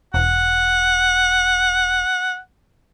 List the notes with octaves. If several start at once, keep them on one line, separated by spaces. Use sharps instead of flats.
E1 F#5